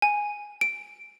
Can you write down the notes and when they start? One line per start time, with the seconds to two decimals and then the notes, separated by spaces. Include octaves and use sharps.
0.02 G#5
0.61 D7